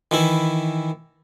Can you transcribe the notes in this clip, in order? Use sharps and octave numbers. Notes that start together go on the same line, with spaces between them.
D#3 E3 E4